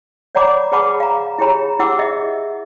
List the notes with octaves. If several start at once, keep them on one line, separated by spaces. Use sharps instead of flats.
C#5 D5 F#5 A#5 B5 D6
G#4 B4 F#5 A5 B5 D6
F5 A#5
E4 G4 G#4 C#5 A#5 B5
E4 G4 F#5 D6 E6
G#4 D#5 E5